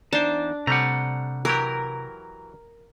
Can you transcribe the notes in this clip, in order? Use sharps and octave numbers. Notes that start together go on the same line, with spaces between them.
E2 D4 D#4 C5 A5
C3 G3 A3 F#5 A#5
E3 F#3 G4 A#4